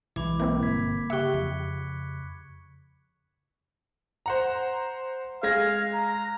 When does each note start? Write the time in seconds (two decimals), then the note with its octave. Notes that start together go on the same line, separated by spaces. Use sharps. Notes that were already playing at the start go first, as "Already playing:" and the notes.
0.16 B1 E3 F3 G#3 B5 D6 G#6
0.40 E3 A#3 C4 E4
0.63 G1 G#6 B6
1.10 C#3 G4 E5 C#6 F#6 C#7
1.34 F2
4.26 C5 F#5 A#5
5.43 G#3 F5 G#6 A#6
5.94 A#5